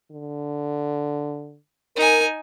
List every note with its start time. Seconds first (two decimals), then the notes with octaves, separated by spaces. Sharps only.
0.11 D3
1.96 D#4 A#4 G#5